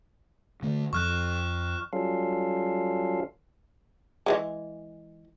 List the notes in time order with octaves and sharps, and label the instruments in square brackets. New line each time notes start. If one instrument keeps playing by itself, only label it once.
[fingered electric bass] D3 A3
[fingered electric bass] F2 F3 [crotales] C#6 F6 F#6
[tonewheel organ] F#3 G3 C#4 F4 A4 F5
[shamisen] E3 F#3 G#3